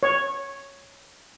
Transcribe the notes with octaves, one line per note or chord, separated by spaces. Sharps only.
C#5